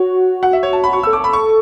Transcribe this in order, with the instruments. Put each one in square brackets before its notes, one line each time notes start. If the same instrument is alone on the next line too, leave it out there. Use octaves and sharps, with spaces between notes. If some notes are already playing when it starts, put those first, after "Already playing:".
Already playing: [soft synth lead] F#4 [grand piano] C#5
[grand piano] F#5
E5
C#5
A5
B5
C#6
E6
[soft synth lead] A4
[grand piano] D6
[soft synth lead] A4 [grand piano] B5
[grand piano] C#6